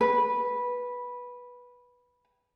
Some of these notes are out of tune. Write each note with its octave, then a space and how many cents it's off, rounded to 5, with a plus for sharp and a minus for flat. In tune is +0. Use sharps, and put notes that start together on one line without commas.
B4 -10